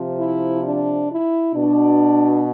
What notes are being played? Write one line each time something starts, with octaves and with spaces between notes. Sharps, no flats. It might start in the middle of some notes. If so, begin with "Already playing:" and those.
Already playing: C3 F3
E4
D4
E4
B2 D4